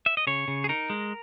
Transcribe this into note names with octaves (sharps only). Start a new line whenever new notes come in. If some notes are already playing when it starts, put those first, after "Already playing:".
E5
D#5
C#3 C#5
C#3
G#4
D#4 A#4
G#3